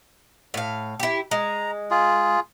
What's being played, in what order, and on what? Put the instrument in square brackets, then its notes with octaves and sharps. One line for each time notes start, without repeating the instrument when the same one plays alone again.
[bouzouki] A2 F5
E4 G4
[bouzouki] G#3 [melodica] A#5
[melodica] F4 G#4